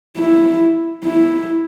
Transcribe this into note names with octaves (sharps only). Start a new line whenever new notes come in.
E4
E4